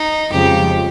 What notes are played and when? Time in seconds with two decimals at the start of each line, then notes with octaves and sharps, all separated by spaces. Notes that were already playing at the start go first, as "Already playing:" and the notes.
Already playing: D#4
0.31 F2 C#3 F3 G#3 G4